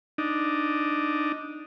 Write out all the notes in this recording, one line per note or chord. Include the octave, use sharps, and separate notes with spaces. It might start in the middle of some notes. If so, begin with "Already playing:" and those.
D4 D#4